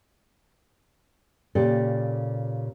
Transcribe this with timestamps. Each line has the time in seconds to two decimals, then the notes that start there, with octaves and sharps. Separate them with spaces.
1.55 A#2 C#3 G4 A4